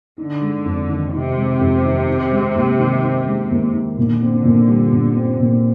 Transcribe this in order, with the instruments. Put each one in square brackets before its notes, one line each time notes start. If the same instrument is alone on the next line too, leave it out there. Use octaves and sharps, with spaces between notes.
[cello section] D3 [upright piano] D#4
[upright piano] G#3
F2
D#3
[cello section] C3 [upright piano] D#4
[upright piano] G#3
F2
D#3
D#4
G#3
D#2
D#3
D#4
G#3
D#2
D#3
[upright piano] A#2 [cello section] D3
[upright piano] C4
A#2
G3
A#2
C4
A#2